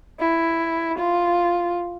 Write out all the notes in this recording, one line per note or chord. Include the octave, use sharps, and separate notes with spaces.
E4
F4